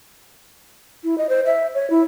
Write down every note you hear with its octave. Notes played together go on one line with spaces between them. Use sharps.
E4
D#5
C5
E5
C#5
E4